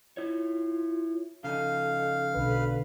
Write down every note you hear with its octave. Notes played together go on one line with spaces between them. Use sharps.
E4 F4 C#5
C#3 F3 D#4 A4 F5
B1 D3 B4